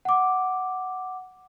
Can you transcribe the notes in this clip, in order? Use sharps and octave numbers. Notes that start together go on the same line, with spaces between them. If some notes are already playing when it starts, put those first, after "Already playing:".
F#5 D6